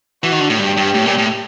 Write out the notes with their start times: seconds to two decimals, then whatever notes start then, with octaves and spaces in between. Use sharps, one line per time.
0.23 E3 F#4
0.32 D#3
0.40 D3
0.50 A2
0.59 G2 G4
0.77 G2
0.94 A2
1.06 A#2
1.18 A2